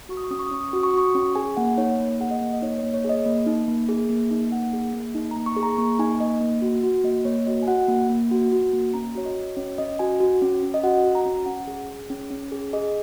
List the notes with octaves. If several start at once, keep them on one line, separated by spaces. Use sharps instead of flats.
F#4 C#6
D#6
C#6
C#4 D#6
C#6
D#6
C#4 C#6
D#6
C#6
F#4 D#6
C#6
D#6
F#4 C#6
C#4
G#4 G#5
A#3 F#5
D#4 C#5
A#3
G#4 F#5
D#5
A#3
D#5
D#4 C#5
C#5
A#3
C#5
G#4 D#5
A#3
D#4
A#3
G#4
A#3
D#4
A#3 F#5
G#4
A#3
D#4
A#5
A#3
C#6
G#4
A#5
A#3 C#6
D#4 G#5
A#3 D#5
A#3
F#4
F#4
A#3 D#5
A#3 C#5
F#4 D#5
G#5
F#4 F#5
A#3
A#3
F#4
F#4
A#3
C#4 A#5
F#4 C#5
D#5
F#4
C#4 C#5
C#4 D#5
F#4 G#5
F#4
C#4
C#4
D#5
F#4 F#5
F#4
A#5
C#4
C#4 F#5
G#4
G#4
C#4
C#4
G#4
G#4 D#5